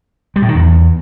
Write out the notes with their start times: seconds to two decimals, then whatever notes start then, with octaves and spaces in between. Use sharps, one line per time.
0.36 G3
0.42 A2
0.49 D#3
0.55 E2